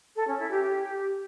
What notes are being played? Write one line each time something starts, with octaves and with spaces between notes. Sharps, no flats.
A4
C#4
E4
G4
G4